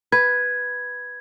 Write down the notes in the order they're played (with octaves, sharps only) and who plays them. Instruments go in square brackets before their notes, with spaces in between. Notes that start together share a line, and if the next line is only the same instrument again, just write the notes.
[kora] B4 [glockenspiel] G#6